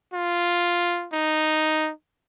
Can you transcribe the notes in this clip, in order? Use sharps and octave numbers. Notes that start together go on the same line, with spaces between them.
F4
D#4